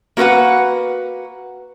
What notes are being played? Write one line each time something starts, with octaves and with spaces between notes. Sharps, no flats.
A#3 F#4 A#4 B4 F#5